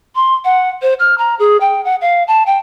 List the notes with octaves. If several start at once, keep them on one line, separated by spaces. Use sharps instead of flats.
C6
F#5
C5
F6
A#5
G#4
G5
F#5
F5
A5
G5